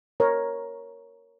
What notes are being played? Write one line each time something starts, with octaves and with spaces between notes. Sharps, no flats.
A#4 C#5